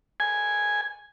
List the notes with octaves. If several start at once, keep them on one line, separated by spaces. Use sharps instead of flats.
G#5